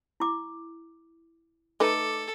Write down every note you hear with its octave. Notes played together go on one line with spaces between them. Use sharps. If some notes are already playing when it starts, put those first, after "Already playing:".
E4 D6
A3 D#4 A4 B4 D6